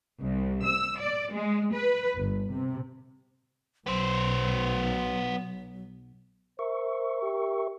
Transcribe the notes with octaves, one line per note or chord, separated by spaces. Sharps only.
C2
E6
D5
G#3
B4
G1
C3
B1 F#3 B3 C5
A#4 C5 E5 C#6
G4